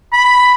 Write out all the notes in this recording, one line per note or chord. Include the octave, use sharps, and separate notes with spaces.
B5